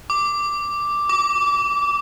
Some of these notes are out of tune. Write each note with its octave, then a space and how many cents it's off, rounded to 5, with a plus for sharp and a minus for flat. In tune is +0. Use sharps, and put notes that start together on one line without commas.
D6 +0
D6 -25